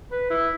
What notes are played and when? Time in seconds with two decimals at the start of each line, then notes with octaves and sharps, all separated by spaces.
0.12 B4
0.30 E4